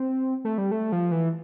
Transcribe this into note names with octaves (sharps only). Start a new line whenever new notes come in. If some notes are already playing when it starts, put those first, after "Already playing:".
Already playing: C4
A3
G3
A3
F3
E3